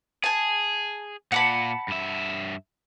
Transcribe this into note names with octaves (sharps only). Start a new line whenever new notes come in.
G#4 G#5 A5
A#2 D5 F#5 A5 B5
G2 E5